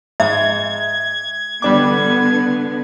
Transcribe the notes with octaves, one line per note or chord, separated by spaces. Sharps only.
G#2 E5 G#6
D3 G3 B3 D4 D6